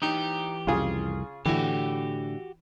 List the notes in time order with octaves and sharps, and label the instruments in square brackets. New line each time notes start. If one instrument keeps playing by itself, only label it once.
[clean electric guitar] E3 G4 [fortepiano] D#4
[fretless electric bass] C2 F2 [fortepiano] C#3 F4 G#4
[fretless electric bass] A2 D3 [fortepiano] E3 [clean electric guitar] F#4 G4